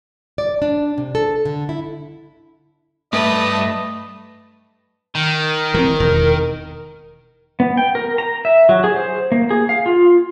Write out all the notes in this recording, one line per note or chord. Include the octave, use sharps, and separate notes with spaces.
D5
D4
C3
A4
D3
E4
G2 A3 B4 D#5 A5
D#3
E3 C4 A#4
E1 E2
B3
G5
A#4
A#5
E5
F#3
G#4
C5
A#3
G#4
F5
F4